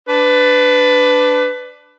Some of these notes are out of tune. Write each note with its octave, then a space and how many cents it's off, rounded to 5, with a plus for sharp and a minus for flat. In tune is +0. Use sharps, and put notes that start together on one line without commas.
D4 +0 B4 +20